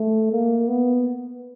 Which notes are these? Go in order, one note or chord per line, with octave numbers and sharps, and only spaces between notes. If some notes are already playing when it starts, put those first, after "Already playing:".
Already playing: A3
A#3
B3